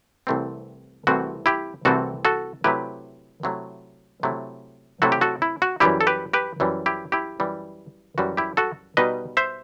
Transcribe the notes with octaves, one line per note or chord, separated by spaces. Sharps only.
C2 C3 E3 A3 C4
C2 C3 E3 A3 C4 F#4
E4 G4
C2 C3 E3 A3 C4 F#4 A4
F#4 A4
C3 F#3 A3 E4 G4 B4
C3 F#3 A3 E4
C3 F#3 A3 E4
C3 F#3 A3 E4 F#4 A4
G4
F#4 A4
E4
F#4
F#2 E3 G3 E4 G4
A4
G4 B4
G4 B4
F#2 E3 G3
E4 G4
E4 G4
F#2 E3 G3
F#2 E3 G3 F#4
E4 G4
F#4 A4
B2 G3 D#4 B4 D#5
C5 E5